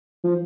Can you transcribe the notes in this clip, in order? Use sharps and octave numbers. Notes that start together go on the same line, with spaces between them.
F3